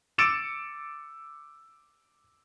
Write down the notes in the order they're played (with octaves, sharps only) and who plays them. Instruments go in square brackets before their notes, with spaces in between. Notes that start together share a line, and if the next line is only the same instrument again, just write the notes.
[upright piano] D6 E6 A6 C#7 D7 E7